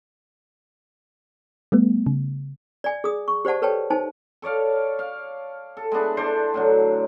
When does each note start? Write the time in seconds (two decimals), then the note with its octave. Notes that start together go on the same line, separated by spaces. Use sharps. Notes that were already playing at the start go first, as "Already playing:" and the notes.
1.72 G3 A3 B3
2.07 C#3
2.84 D5 G#5
3.04 G#4 D#6
3.28 C#6
3.45 G4 C5 D5 F#5 A5
3.62 A4 B4 C#5 G5 A5
3.90 D#4 C5 G#5 A5
4.42 A4 C#5 D5 F5
4.99 F5
5.77 A4
5.92 G#3 B3 D4 E4
6.17 D4 A4 C5 D5
6.54 A2 D3 F#3